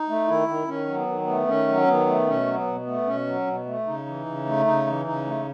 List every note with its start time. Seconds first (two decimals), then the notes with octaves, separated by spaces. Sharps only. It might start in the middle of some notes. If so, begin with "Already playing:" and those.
Already playing: D#4
0.09 A3
0.28 D#3 E4
0.48 D#3
0.67 D#3 C#4
0.87 F#3
0.95 B3
1.08 D#3
1.21 B3
1.28 A3
1.47 D#3 C#4
1.68 F#3
1.87 D#3 B3
2.07 A3
2.27 B2 C#4
2.47 F#3
2.54 B3
2.67 B2
2.81 B3
2.86 A3
3.07 B2 C#4
3.26 F#3
3.47 B2
3.66 A3
3.86 C#3 D#4
4.06 E3
4.26 C#3
4.45 A3
4.66 C#3 D#4
4.86 E3
5.05 C#3 D#4
5.26 A3